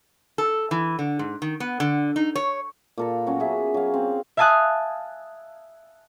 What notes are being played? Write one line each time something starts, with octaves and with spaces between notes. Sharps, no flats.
A4
E3
D3
G#2
D#3
B3
D3
D#4
C#5
A#2 A4 A#5
F#3 B3 C#4 F#4
G#4 E5
F#3 F5
C4
E5 F5 G#5 A5 D#6 F#6